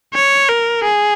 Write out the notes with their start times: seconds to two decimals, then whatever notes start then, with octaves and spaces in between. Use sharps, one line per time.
0.14 C#5
0.49 A#4
0.84 G#4